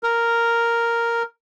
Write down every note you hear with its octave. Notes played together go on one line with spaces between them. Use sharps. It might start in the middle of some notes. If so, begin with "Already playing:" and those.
A#4